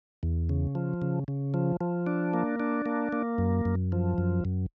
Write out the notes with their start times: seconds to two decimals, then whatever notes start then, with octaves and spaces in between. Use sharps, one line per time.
0.23 E2
0.49 C#3
0.75 F3
1.02 C#3
1.28 C#3
1.54 F3
1.81 F3
2.07 D4
2.33 A#3
2.60 D4
2.86 A#3
3.12 A#3
3.38 F#2
3.65 F#2
3.92 F3
4.18 F#2
4.45 F#2